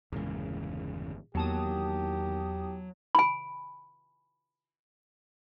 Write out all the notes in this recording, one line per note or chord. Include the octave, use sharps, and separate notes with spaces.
G1 E2 A#2 C#3 G#3
E2 D#3 F#3 A#3 G4 A5 D#6
G#5 B5